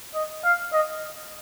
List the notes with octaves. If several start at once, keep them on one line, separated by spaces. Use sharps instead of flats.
D#5
F5
D#5